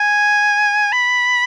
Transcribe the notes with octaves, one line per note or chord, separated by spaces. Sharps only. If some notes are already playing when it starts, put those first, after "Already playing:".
Already playing: G#5
B5